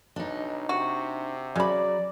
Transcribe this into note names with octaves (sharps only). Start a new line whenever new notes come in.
B1 D4 D#4
C3 F#4
C#3 F#3 D5 B5